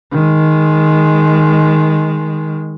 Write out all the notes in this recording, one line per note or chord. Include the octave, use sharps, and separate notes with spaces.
D#3 G#3